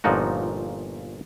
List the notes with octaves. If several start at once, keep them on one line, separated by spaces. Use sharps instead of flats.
G1 A#2 F3 D#4 F#4